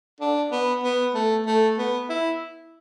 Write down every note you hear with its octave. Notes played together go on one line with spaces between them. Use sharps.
D4
B3
B3
A3
A3
B3
E4